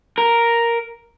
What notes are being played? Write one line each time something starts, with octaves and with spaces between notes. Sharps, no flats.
A#4